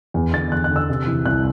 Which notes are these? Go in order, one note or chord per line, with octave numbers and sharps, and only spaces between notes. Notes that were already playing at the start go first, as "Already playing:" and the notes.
E2
D3 A6
E2 F#6
F#6
D3
E6
C3
E3
C2 F#6